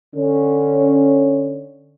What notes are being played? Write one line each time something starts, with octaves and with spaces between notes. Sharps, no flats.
D3 C#4